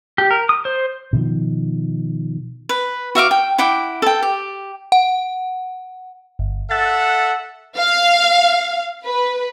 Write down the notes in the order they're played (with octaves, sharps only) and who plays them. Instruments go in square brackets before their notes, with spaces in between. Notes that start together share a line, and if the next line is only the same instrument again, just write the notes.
[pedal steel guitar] G4
A#4
D#6
C5
[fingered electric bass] B2 D#3 F3
[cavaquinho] B4
F#4 E5 F5 D6
G5
E4 F#5 G5 D6
A4 G5
G4
[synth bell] F#5
[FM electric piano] G1
[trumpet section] A4 E5 F#5 [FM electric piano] F#6 A6
[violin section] F5
B4